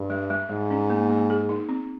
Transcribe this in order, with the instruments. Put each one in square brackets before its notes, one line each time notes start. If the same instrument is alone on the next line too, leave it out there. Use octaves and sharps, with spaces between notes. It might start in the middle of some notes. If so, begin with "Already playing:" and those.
Already playing: [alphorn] G2
[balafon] G3
G3
[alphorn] G#2 [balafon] G3
[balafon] C#4
A#3
A#3
G#4
D#4
C4